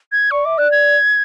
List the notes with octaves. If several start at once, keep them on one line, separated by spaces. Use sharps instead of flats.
G#6
D5 C#6
E5 D6
D5 F#6
G#6